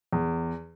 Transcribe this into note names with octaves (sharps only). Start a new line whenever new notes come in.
E2